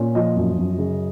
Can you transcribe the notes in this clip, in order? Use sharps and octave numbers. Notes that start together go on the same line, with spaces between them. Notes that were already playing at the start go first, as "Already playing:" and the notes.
Already playing: A#2 C#4
F3 D#5
F#2
F#2
C#3